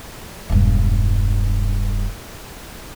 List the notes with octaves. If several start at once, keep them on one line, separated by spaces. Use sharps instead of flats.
E1 G2